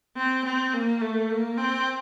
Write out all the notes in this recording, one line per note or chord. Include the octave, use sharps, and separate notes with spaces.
C4
C4
A#3
A3
A#3
C4